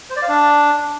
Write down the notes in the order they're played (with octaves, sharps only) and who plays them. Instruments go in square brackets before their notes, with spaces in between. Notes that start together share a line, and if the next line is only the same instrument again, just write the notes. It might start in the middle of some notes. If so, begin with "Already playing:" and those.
[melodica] C5
D5
F5
D4